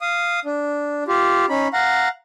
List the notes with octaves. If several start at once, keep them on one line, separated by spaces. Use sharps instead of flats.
F5 D#6
D4
F4 G4
C#4 D#4 B5
F5 F#5 A#5